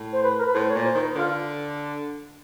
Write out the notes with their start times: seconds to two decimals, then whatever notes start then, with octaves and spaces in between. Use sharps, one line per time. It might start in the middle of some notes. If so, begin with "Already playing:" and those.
Already playing: A2
0.13 C5
0.23 B4
0.38 A#4
0.46 B4
0.54 A2 C5
0.69 C#5
0.74 A#2
0.85 C5
0.95 D#3
1.00 B4
1.15 D3 F4